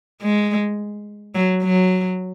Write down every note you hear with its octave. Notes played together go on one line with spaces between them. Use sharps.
G#3
F#3
F#3